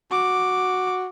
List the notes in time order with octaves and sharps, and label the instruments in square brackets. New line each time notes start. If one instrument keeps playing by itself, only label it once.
[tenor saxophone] F#4 [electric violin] D6